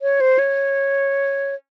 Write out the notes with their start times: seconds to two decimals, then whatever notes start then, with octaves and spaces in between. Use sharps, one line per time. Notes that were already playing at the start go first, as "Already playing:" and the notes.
0.02 C#5
0.21 C5
0.39 C#5